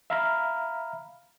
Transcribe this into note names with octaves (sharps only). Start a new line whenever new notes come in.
E5 F5 A#5 B5 F6